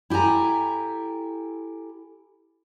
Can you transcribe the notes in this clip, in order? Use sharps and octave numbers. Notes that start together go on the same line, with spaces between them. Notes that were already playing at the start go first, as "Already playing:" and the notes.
E4 G4 A4 G#5 A#5